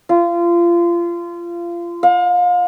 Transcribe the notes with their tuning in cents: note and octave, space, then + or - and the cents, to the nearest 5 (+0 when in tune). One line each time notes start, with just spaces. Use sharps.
F4 -25
F5 +35